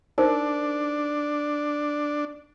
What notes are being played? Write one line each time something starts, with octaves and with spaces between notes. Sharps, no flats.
D4 D#4 A#4 C5